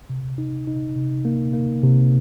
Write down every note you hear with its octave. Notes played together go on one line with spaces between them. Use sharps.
C3
D#4
D#4
C3
A#3
A#3
C3